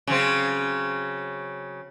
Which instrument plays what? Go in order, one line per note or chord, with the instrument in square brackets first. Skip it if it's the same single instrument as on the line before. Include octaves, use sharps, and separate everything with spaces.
[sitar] C#3 F#3 C4